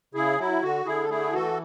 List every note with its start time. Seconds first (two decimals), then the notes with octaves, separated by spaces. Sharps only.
0.14 C#3 E4 G#4
0.39 F#3 E4
0.62 D3 F#4
0.85 D3 E4 G#4
1.03 A4
1.09 A3 E4 G#4
1.33 E3 F#4 A4